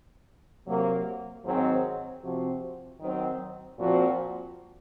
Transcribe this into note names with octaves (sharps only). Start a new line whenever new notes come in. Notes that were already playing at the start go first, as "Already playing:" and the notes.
C3 F#3 A#3
G#2 D#3 F#3 C4
C3 F3 C4 F#4
D#3 F#3 C4
A#2 F3 C4 F#4